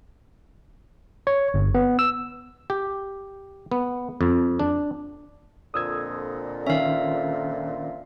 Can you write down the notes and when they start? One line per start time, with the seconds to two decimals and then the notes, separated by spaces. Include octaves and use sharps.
1.27 C#5
1.54 G1
1.75 B3
1.99 E6
2.70 G4
3.72 B3
4.21 F2
4.59 D4
5.74 F2 A#2 D3 D#6 E6 G#6
6.67 D#3 C#4 E5 F5